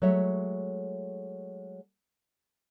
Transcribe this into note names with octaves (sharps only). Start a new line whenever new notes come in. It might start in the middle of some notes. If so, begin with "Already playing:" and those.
F#3 G#3 A3 C#5 E5